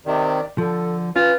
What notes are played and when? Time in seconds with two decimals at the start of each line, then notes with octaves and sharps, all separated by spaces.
0.06 C3 D#3 D5
0.58 D3 F3 A4
1.16 C#4 F4 B4